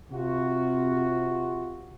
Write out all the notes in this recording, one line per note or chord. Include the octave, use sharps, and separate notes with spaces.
C3 F4 F#4